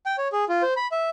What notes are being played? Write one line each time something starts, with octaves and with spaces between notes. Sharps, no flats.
G5
C#5
G#4
F4
C5
B5
E5